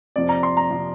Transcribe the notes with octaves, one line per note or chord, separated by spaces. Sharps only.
F2 C3 F3 D5
A#5
C6
A#5
C3 F3